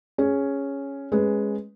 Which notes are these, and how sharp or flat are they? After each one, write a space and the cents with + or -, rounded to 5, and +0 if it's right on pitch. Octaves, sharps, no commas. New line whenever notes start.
C#4 +0 G#4 +0
G#3 +0 C#4 -10 B4 +0